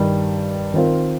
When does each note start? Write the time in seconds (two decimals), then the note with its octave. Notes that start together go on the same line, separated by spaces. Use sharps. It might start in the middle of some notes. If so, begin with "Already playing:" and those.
Already playing: G2 D#3 G3
0.74 D#3 C4 F4 A#4